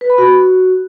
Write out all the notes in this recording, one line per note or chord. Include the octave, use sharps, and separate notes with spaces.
B4
B5
F#4